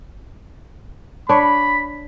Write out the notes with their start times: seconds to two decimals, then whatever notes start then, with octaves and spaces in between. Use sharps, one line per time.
1.29 D4 C#5 B5